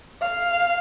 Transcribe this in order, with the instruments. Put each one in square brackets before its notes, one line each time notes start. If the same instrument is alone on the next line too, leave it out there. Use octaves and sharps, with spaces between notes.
[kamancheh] F5